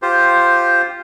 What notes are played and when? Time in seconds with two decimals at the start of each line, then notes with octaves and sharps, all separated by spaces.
0.02 F4 G4 C5